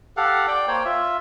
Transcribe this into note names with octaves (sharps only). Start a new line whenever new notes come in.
G4 A4 F5 F#5
D5 G5
A#3 C5 C#5 G5
F4 E5